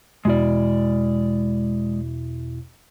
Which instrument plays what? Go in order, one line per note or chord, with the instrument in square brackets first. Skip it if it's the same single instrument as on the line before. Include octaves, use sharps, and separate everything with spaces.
[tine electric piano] E2 B2 E4 [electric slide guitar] G#3 D5